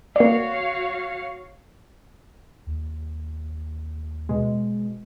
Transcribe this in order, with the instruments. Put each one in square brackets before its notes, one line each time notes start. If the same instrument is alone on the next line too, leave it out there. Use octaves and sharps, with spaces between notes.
[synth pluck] A#3 D5 [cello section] F#4 C#5 F5
[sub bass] D#2
[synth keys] B2 G#3